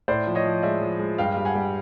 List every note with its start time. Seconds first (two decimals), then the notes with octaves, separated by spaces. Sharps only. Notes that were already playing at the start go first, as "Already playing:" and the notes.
0.08 A2 C5 D5
0.27 F3
0.35 C#5 D#5
0.45 F3
0.63 G#3 D5 E5
0.81 F3
0.99 G#3
1.18 G2 F5 G5
1.37 G3
1.45 F#5 G#5
1.55 G3